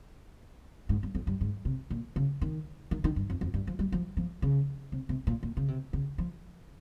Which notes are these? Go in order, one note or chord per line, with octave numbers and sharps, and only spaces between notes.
G#2
G2
F2
G2
G#2
C3
A#2
C#3
D#3
D#3
D#3
G2
F2
F2
G2
F3
G3
F3
F3
C#3
C3
C3
A#2
A#2
C#3
C3
C#3
F3